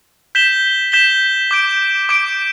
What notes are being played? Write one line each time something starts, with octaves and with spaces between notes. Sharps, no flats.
G6 B6 E7 G7
G6 B6 E7 G7
D6 G6 D7
D6 G6 D7